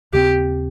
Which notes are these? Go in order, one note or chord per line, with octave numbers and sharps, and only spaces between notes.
D#2 C#3 G#3 C4 G4